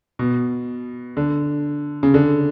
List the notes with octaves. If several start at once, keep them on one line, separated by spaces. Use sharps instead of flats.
B2
D3
C#3
D3